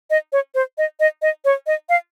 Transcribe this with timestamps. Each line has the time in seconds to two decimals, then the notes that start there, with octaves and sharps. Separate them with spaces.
0.10 D#5
0.32 C#5
0.55 C5
0.78 D#5
1.00 D#5
1.22 D#5
1.45 C#5
1.67 D#5
1.89 F5